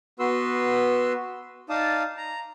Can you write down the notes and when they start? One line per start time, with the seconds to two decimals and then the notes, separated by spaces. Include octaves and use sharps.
0.20 B3 F#4 B4 C6 E6
1.69 D#4 D5 F5 A5 D#6
2.17 A#5